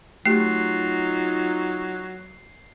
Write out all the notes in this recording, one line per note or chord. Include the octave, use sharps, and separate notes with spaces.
F#3 A3 D#4 F4 G4 C7